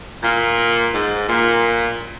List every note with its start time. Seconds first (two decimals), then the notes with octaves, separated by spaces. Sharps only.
0.22 A#2
0.92 G#2
1.27 A#2